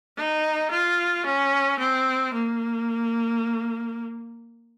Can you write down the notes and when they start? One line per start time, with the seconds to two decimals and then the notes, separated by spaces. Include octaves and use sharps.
0.17 D#4
0.71 F4
1.26 C#4
1.79 C4
2.34 A#3